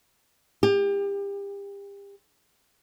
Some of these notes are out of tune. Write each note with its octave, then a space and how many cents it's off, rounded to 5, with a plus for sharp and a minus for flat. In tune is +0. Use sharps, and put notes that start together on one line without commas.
G4 +35